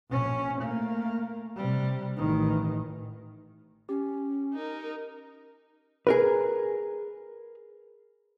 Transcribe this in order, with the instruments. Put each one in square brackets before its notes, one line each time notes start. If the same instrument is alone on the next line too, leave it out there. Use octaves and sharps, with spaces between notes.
[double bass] A#1 C#4
A3 A#3
C3 G3
A1 D#3
[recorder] C#4 [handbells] G4
[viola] D#4 A#4
[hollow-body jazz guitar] G#4 A#4 B4